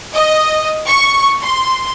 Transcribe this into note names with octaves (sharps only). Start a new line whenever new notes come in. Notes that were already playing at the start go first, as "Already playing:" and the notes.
D#5
C#6
C6